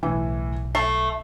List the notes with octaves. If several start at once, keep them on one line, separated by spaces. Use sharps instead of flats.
B1 A2 E3
A3 C7